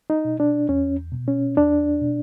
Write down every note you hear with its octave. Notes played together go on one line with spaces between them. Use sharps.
D#4
B2
D4
E2 C#4
B2
C#4
E2 D4
B2